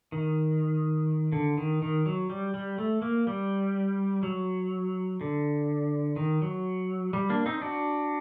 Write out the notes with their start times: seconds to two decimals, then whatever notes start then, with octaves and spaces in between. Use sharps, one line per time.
0.12 D#3
1.32 D3
1.57 D#3
1.82 D#3
2.06 F#3
2.30 G3
2.54 G3
2.78 A3
3.02 A#3
3.27 G3
4.23 F#3
5.21 D3
6.16 D#3
6.42 F#3
7.13 G3
7.29 A#3 D4
7.46 C4 D#4
7.62 D4 F#4